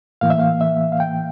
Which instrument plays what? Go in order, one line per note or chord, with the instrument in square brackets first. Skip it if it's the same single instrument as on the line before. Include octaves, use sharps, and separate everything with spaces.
[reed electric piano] A2 E3 A#3 F5
E5
F5
E5
F5
G5